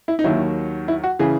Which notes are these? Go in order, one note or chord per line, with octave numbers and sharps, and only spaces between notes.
E4
D#4
D#2 D#3 F#3 E4
E4
F#4
C#3 E3 G#4